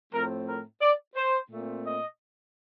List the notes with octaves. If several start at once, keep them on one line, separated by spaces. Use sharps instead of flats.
A2 F3 A3 C4 A#4
A#4
D5
C5
A#2 A3 C4
D#5